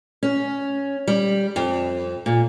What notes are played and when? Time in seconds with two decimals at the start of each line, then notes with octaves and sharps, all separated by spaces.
0.23 C#4
1.07 G3
1.56 F2
2.26 A#2